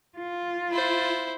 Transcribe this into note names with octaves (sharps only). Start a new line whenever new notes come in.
F4
E4 C5